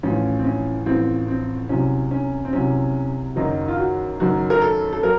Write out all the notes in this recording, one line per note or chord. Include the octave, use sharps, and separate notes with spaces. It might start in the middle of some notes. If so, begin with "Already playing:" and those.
A1 A2 F3 C#4
C4
C#4
A1 A2 F3 C4
C4
C2 C3 F#3 C#4
C#4
C4
C2 C3 F#3 C#4
F#1 F#2 D#3 F#3 D#4
F4
F#4
F#1 F#2 D#3 F#3 F#4
A#4
A4
A4
F#3 A#4